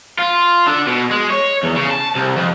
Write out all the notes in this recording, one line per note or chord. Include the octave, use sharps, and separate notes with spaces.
F4
D3
B2
G#3
C#5
E2
C#3
A5
C2
F2